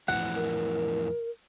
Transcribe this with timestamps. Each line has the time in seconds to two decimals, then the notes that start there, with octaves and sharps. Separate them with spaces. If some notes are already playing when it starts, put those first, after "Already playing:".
0.08 F2 A2 E3 F#5
0.36 A#4